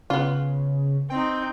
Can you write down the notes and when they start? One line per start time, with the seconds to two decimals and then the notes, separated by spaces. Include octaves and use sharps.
0.10 C#3 B3 F4
1.10 C4 D#4 G5